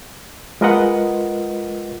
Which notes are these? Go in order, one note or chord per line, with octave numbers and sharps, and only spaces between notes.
G#3 F4 A#4 B4 D#5 F#5